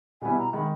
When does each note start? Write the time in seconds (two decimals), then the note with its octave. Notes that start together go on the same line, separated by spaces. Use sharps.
0.21 B2 G3 B3 E4 G#5
0.38 A#5
0.53 D#3 G#3 B5